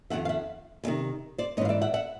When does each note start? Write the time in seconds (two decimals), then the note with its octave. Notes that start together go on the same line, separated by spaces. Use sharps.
0.10 F2 C3 D#3 E5 F#5
0.25 F5
0.29 E5 F#5
0.84 D2
0.87 C3 D#3
1.38 C5 D5
1.57 G#2 C#5 D#5
1.61 E3 F5
1.69 D5 E5
1.82 E5 F#5
1.94 E5 F#5